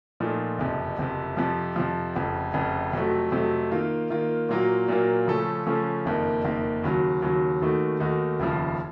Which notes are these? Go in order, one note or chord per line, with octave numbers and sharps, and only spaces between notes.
A#2 F3 A3 D#4
F#1 F2 C3
F#1 F2 C3
F2 C3 F3
F2 C3 F3
F1 F2 C#3
F1 F2 C#3
F2 C3 F#3 A3
F2 C3 F#3 A3
D#3 A#3 F4
D#3 A#3 F4
A#2 F#3 A#3 F4 A#4
A#2 F#3 A#3 F4 A#4
C#3 F3 A3 C#4 A4
C#3 F3 A3 C#4 A4
F#1 F2 D#3 A#3
F#1 F2 D#3 A#3
D#2 C#3 F#3
D#2 C#3 F#3
D#2 D#3 A3 D#4 F#4
D#2 D#3 A3 D#4 F#4
F1 D#2 C#3 F3